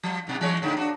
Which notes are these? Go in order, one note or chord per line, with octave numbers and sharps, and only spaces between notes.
F3
G#2 B2
E3 G#3 C#5
A2 D3 D#4
D4 F#4